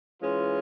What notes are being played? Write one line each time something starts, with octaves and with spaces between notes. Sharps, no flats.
E3 G#3 C#4 F4